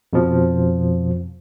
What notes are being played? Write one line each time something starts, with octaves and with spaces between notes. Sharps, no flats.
F2 B2 F3